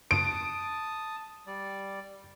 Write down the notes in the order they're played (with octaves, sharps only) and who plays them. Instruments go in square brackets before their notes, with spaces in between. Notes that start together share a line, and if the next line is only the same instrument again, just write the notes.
[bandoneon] A5 D#6 [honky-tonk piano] D7
[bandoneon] G3 D5